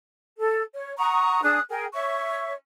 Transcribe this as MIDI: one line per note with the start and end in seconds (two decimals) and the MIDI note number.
0.37 0.61 69
0.73 0.93 73
0.97 1.40 78
0.97 1.40 82
0.97 1.40 85
0.97 1.40 87
1.43 1.59 62
1.43 1.59 68
1.43 1.59 87
1.43 1.59 90
1.69 1.85 68
1.69 1.85 70
1.69 1.85 79
1.93 2.51 73
1.93 2.51 76
1.93 2.51 85